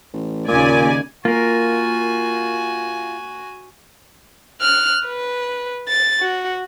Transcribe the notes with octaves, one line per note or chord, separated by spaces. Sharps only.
A1
D#2 A#2 C#3 D5 G#5
A#3 F4 F#4 A#4 G#5
F6 F#6
B4
A6
F#4